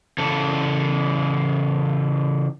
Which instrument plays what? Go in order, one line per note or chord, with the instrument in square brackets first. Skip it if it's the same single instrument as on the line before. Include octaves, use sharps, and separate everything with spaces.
[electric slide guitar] C#3 E3 A4